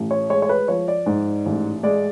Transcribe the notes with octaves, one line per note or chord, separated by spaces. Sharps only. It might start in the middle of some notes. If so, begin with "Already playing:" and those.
Already playing: A1
C#5
G#3 C#5
C#5
B4
F3 C#5
D5
G#2
A1
G#3 D5